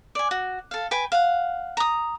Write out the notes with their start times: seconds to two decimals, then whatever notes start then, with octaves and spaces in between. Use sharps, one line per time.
0.15 D5 G#5
0.31 F#4
0.71 A4 F5
0.91 B4 G5 G#5
1.12 F5 F#5
1.77 A#5 D#6